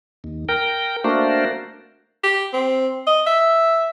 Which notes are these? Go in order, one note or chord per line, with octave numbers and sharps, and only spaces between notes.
D#2
A#4 G5
A3 A#3 D4 F#4 A#4 C5
G4
C4
D#5
E5